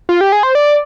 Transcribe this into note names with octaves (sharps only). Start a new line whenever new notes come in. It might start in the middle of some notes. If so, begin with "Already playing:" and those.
F4
G4
G#4
C5
D5